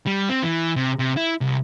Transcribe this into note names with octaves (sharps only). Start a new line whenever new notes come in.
G3
C4
E3
C3
C3
E4
C2